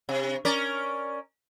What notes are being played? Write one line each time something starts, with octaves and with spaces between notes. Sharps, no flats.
C3
C#4 A#4 D5